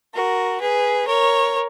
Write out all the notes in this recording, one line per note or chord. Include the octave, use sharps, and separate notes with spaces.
F#4 A#4
G#4 B4
A#4 C#5